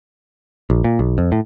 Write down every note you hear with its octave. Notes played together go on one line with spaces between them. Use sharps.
A#1
A#2
B1
F2
A2